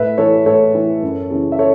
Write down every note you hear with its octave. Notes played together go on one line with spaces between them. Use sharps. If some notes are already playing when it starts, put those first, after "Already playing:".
Already playing: A2 B4 E5
E3 A4 C#5
A2 A4 C#5
E3
F#2
C#3 E3
E5
A4 C#5